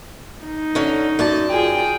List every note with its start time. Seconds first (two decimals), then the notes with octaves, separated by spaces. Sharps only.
0.45 D#4
0.75 D3 C#4
1.19 F#2 D5 A5
1.51 F4 G#4 G5